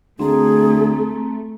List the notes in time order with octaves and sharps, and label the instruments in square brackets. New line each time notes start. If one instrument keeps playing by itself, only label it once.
[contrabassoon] D2 [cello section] A3 [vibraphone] C4 A#5 [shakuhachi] G#4